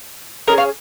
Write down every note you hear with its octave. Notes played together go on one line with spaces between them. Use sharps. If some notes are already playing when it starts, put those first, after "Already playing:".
C#4 F4 G#4 A#4 D#5
C#5 F5